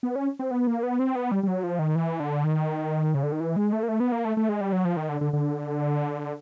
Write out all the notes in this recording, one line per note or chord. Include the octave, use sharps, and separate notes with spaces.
B3
C#4
C4
B3
A#3
B3
C4
B3
G3
G3
F#3
F3
D#3
E3
D3
D#3
C#3
D3
D#3
E3
G#3
A3
A#3
A3
B3
A#3
A3
A3
G#3
G3
F#3
F3
D#3
D3
D3
D3